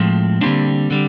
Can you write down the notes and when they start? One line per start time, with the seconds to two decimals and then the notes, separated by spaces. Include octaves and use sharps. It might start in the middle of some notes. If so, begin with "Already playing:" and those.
Already playing: A2 F3 G#3 C4
0.41 D3 G3 A#3 C4 D4
0.91 D3 G3